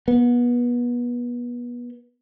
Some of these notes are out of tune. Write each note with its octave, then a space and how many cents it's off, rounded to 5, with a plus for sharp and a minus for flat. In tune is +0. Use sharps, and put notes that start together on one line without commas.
B3 -30